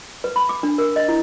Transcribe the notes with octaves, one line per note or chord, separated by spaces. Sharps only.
B4
B5
D6
D4
A#4
D#5
E4